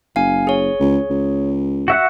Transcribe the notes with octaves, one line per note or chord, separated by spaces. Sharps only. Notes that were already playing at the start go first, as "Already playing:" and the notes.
F#1 F5 G#5
G#4 C#5
C#2
C#2
F#4 E5 F#5